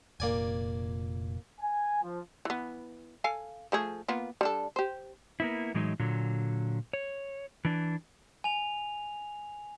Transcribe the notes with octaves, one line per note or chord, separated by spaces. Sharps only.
F1 A#2 A#3 D5 G#5
G#5
F3
E3 B3
A4 F5 G#5
F3 A3 G#4
A#3 B3 F4
G3 D4 A4
G4 C5
A#3 B3 E4
A2 E3 F#3 G#3 D#4
A#2 D3 F#3
C#5
E3 D4
G#5 F7